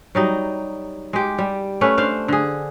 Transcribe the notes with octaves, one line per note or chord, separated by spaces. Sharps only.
F#3 G3 D#4
G#3 G4
G3
A3 C#4 B4
D4 C5 F5
D3 G#4